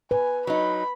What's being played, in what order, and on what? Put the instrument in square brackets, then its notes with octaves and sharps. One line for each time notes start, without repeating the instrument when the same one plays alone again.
[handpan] B4 [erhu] G#5
[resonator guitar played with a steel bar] F#3 D#4 [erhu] B5